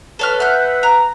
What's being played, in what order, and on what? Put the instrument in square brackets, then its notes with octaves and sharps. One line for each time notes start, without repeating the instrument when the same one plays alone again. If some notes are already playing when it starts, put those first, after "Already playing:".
[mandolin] A4 C#5 F6 [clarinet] B4
[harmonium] E5 F#5 [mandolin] F6 G6
[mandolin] A#5